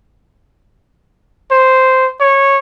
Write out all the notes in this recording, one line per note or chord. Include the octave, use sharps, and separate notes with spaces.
C5
C#5